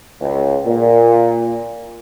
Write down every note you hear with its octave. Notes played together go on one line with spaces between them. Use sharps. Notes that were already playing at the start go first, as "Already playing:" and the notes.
C#2
A#2